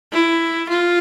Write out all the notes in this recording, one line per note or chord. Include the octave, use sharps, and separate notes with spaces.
E4
F4